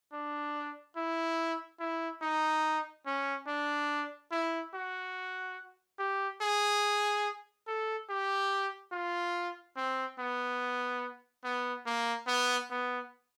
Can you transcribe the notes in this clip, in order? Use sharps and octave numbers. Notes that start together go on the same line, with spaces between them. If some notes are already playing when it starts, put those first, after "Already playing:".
D4
E4
E4
D#4
C#4
D4
E4
F#4
G4
G#4
A4
G4
F4
C4
B3
B3
A#3
B3
B3